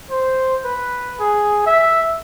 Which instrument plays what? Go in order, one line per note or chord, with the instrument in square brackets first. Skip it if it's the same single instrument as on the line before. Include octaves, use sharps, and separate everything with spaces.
[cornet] C5
B4
G#4
E5